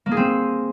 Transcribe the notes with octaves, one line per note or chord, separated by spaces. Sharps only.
A#3
G#4
C4